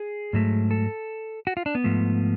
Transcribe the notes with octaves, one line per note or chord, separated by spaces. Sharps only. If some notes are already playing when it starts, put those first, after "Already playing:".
Already playing: G#4
G#2 F#3 A3
A4
F#4
F4
D4
B3
G#2 F3 A3